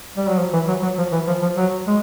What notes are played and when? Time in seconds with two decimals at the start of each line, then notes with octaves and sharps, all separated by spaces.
0.17 G3
0.28 F#3
0.38 F3
0.53 E3
0.68 F#3
0.82 F#3
0.98 F3
1.12 E3
1.27 F3
1.42 F3
1.57 F#3
1.87 G#3